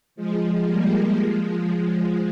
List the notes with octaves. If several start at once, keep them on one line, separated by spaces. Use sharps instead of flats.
F3 G#3
G3 A#3
F3 G#3